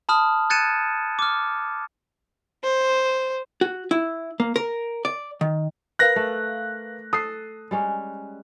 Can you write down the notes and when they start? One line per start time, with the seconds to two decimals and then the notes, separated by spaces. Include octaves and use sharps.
0.09 A5 B5 D#6 F6
0.50 F#6 G#6 A6 C#7 D#7 E7
1.19 D6 F6
2.63 C5
3.61 F#4
3.91 E4
4.40 A#3
4.56 A#4
5.05 D5
5.41 D#3
5.99 A#4 B4 F5 F#6 A#6
6.16 A3
7.13 A4 D#6 C7
7.71 G3 G#3 C#4